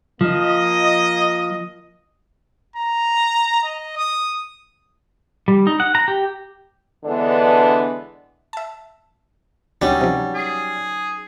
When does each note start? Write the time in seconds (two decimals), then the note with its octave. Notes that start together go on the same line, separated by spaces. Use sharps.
0.21 F3 A#3 D#5
2.76 A#5
3.64 D#5
3.97 D#6
5.48 G3
5.67 D#4
5.80 F#5
5.95 A#5
6.08 G4
7.05 D3 E3 G#3 B3 D4
8.53 E5 A5
9.82 D2 F#3 G3 C#4 D#4
10.01 C3 F3
10.35 G#4